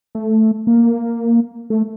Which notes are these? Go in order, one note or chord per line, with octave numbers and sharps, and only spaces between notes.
A3
A#3
A3